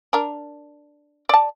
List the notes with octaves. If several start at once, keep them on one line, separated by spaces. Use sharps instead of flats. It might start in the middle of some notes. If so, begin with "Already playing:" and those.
D4 A#4
D5 A5